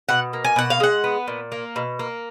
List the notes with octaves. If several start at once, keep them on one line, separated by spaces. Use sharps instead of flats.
B2 F#5
A#3
G#5
B2 F#5
F5
G#3 F#5
B3
A#2
A#3
B2
A#3